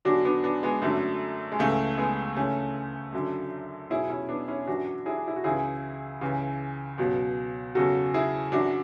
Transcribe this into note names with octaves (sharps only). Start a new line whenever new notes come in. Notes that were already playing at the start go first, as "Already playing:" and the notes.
E2 D3 F#3 D4 F#4
B3 D4
B3 D4
G#3 B3
F#2 D3 F#3 A3
G#3
C#2 C#3 E3 A3
G#3 B3
D2 C#3 E3 A3 C#4
F#2 D3 F#3
E2 B2 F#3 E4 G#4
C#4 E4
B3 D4
C#4 E4
F#2 E3 D4 F#4
E4 G#4
E4
F#4
C#2 C#3 E3 E4 G#4
C#2 C#3 E3
C#2 B2 F#3
E2 C#3 F#3 F#4 A4
E4 G#4
F#2 E3 D4 F#4